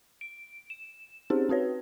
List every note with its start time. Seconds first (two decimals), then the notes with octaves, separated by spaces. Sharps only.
0.21 D7
0.70 E7
1.30 C4 C#4 D#4 G4 G#4 C5
1.49 C4 F#4 B4 C#5